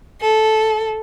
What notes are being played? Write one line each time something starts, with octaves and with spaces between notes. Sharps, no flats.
A4